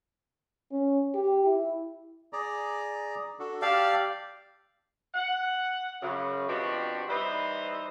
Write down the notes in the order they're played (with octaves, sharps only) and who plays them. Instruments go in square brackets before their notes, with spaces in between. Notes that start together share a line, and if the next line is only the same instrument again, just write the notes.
[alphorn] C#4
G4
E4
[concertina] G#4 D5 A#5
D4 F#4 A4
[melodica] G4 D5 F5 [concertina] A5 E6 F6
[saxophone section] F#5
F#2 C#3
B2 F3 C4 D4 F#4 G4
E3 G3 D#4 B4 C5